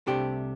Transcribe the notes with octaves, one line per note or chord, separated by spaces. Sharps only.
C2 C3 A3 D4 G4